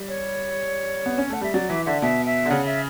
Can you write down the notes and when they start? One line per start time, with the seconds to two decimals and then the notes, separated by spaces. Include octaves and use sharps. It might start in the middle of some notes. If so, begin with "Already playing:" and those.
Already playing: G3
0.08 C#5
1.06 B3
1.18 C#4
1.30 A3 F#5
1.41 G3 E5
1.54 F#3 D5
1.69 E3 E5
1.86 D3 E5
2.02 B2 E5
2.26 E5
2.45 D3
2.50 C#3 F#5
2.66 E5